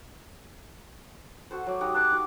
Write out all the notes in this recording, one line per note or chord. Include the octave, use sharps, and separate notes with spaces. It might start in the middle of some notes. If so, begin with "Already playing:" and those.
F#4 A4 C5
F#3 D5
D#4 G4 F#5
A5 C6 D6 F#6
D#4 F#4